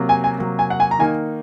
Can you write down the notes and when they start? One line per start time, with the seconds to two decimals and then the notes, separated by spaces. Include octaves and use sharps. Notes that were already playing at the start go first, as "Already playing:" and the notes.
Already playing: C3 F#3 A#3
0.09 G#5
0.24 G#5
0.39 C3 F#3 A#3
0.59 G#5
0.70 F#5
0.80 G#5
0.91 A#5
0.99 D#3 A#3 D#4 G#5